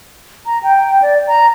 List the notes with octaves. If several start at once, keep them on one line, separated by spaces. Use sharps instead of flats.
A#5
G5
D5
A#5